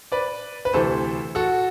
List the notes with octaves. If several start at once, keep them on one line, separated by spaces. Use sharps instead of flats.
B4 D5
B4
D2 C3 E3 A4 C5
F#4 A4